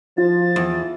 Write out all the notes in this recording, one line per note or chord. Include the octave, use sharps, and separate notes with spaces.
F3 F4 A6
E2